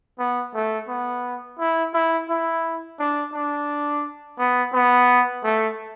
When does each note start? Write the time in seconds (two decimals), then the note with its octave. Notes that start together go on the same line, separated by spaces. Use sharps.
0.19 B3
0.55 A3
0.88 B3
1.59 E4
1.93 E4
2.29 E4
3.00 D4
3.34 D4
4.39 B3
4.73 B3
5.44 A3